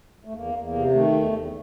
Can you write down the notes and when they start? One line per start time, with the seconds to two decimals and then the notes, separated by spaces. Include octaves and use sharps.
0.25 A3
0.33 E2 A#3
0.53 E2
0.63 A#3
0.72 C3
0.92 D#3 A3
1.12 E2
1.32 E2